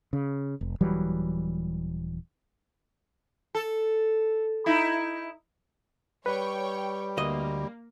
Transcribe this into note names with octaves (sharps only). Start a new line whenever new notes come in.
C#3
F1
D#1 E3 F#3 G3
A4
D#4 E4
G3 B4 C#5 G5 C#6
D2 A#3 D#5